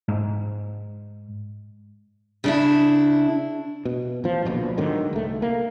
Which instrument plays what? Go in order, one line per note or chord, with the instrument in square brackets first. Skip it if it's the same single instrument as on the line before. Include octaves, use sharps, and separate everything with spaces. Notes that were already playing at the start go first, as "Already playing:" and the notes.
[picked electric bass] G#2
[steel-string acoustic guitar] C#3 D4 E4
[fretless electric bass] B2
A1 F3
D1 A#1 B2
G#2 D3 D#3 F#3
C2 A3
A#3